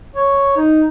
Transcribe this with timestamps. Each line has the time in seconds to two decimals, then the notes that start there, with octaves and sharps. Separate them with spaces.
0.16 C#5
0.57 D#4